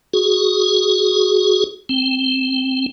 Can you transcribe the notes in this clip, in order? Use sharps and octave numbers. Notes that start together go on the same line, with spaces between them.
F#4 G#4
C4